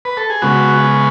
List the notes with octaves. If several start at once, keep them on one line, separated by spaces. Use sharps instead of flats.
B4
A4
G#4
C#3 G#3 B3 F#4